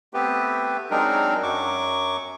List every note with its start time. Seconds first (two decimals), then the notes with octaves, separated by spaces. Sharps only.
0.14 A3 B3 C4 G4 B4
0.90 F#3 G#3 C4 D4 D#4 A#4
1.43 F#2 F#3 C#6 D6